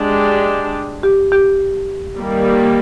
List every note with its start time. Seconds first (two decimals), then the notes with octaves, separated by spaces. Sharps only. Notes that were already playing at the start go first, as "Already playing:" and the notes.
Already playing: G#3 D4 G4
1.03 G4
1.32 G4
2.18 D#3 G3 A#3